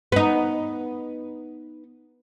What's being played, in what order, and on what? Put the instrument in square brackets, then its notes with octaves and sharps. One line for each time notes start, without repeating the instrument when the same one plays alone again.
[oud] B3 D#4